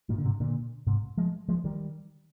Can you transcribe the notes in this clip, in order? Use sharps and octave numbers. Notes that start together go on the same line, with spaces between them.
G2 A#2
D3
G#2 C3
A#2 D3
G#2 C3
F3 G#3
F3 G#3
D#3 G3